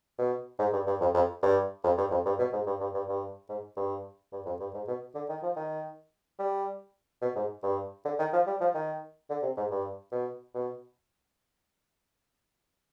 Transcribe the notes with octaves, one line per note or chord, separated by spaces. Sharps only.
B2
G#2
G2
G2
F2
F2
G2
F2
G2
F2
G2
B2
G#2
G2
G2
G2
G2
G#2
G2
G2
F2
G2
G#2
B2
D3
D#3
F3
D#3
G3
B2
G#2
G2
D3
D#3
F3
G3
F3
D#3
D3
C3
G#2
G2
B2
B2